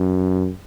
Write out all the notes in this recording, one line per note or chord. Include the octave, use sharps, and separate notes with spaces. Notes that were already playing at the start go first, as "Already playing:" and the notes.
Already playing: F#2